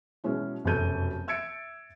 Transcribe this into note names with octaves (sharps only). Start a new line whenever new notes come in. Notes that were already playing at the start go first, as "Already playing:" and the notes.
B2 F#3 G#3 C#4 E4
F1 F#2 B2 A4 G6 D#7
E5 E6 G#6 A6 C#7 D7